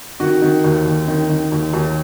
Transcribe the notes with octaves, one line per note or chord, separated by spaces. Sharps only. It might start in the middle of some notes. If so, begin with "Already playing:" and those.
D#3 F#4
D#3
D#2
D#2
D#3
D#3
D#2
D#2